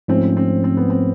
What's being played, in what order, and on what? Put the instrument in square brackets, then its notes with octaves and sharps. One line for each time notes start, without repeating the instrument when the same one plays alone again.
[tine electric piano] G#2 F3 A3 C#4 [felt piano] C4
[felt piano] C4
C4
B3
C4